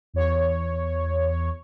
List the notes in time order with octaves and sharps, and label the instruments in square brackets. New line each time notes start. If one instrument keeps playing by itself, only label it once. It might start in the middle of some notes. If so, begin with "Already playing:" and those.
[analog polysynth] E2 C#5